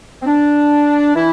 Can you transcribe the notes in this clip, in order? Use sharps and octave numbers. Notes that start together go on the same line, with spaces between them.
C4
D4
E3 E4